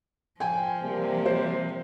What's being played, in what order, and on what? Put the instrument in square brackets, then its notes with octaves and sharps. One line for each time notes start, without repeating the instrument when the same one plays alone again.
[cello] F3 [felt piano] G5 G#5
[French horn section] C3 G3 A#3
[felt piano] C5